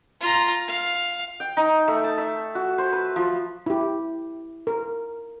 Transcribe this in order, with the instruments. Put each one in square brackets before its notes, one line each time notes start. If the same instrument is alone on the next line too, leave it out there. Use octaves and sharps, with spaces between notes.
[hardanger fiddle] F4 A#5
F5
[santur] G5
D#4
A3
A5
E5
F#4
C5
B4
F3
[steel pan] E4 G4
A#4